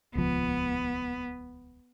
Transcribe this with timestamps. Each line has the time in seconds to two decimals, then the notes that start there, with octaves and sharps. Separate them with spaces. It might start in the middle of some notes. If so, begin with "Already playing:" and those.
0.15 D#1 C#2 F3 B3